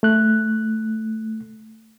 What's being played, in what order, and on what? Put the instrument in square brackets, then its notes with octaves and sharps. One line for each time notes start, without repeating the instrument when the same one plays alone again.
[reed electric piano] A3 F#6